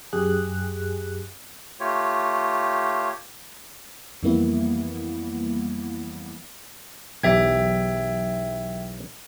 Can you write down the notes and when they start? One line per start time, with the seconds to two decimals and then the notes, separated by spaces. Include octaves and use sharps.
0.13 F#2 G4 G#4 F#6
1.80 A3 F4 G4 C#5
4.23 F2 E3 G3 A#3 B3 E4
7.23 B1 E2 G4 E5 G5 G#6